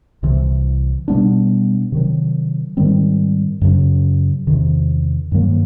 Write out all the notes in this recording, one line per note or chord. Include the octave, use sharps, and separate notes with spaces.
C2 C3 E3
B2 G3 B3 D4
C3 D#3 F#3
G#2 D#3 G3 C4
F#2 C#3 F#3
E2 C3 D#3
G2 D#3 F#3 A#3